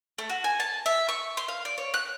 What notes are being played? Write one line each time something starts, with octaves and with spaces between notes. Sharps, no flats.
A3
F#4
G#5
A5
E5
C#6
C6
F5
D5
C#5
F#6